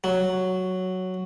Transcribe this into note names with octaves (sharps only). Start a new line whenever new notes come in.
F#3